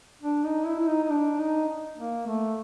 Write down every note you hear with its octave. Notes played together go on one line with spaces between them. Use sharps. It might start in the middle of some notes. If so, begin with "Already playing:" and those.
D4
D#4
E4
E4
D#4
D#4
D4
D#4
A#3
A3